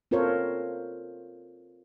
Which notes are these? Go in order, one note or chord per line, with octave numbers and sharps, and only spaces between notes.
C4 F4 A4 A#4 C5 C#5